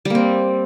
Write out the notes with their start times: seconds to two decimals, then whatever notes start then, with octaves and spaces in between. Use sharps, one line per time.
0.05 G3
0.10 A#3
0.15 C4